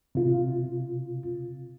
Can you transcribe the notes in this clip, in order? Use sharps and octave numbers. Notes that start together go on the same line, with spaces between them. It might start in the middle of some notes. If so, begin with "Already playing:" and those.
C3 F4